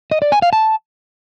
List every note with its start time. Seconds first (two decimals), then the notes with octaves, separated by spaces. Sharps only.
0.11 D#5
0.22 D5
0.32 G#5
0.42 F5
0.53 A5